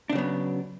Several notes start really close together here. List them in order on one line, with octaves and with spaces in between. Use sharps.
D4 C#3 F#3 B3